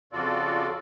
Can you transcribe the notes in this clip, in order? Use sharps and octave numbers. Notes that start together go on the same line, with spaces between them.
F2 C#3 F4 F#4 A4 D5